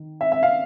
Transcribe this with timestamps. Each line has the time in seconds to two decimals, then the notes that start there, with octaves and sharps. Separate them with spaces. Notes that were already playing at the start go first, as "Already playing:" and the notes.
Already playing: D#3
0.21 E5
0.32 E5
0.43 F5